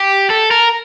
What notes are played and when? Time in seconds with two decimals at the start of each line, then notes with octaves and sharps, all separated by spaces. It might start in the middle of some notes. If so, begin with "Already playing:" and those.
Already playing: G4
0.30 A4
0.51 A#4